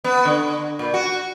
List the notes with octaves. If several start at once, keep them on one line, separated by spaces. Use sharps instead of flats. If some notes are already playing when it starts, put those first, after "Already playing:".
B3
D3
A#2
F#4